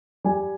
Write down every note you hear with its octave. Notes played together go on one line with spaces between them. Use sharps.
G3 G#5